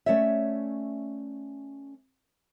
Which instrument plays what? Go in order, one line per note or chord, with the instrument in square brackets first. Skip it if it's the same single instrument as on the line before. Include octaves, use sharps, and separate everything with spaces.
[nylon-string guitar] A3 C#4 C#5 D5 E5